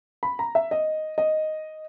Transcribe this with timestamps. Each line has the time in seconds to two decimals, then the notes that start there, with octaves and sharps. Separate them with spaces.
0.23 B5
0.39 A#5
0.55 E5
0.71 D#5
1.18 D#5